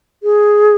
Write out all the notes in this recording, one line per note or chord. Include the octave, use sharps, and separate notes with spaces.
G#4